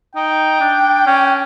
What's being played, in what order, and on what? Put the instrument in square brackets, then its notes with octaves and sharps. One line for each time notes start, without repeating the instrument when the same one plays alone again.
[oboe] D#4 [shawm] G5
[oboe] D4
C#4